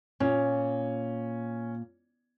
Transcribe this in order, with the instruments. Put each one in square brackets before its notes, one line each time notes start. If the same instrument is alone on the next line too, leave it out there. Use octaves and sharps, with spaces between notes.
[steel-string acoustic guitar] A#2 [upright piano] C#4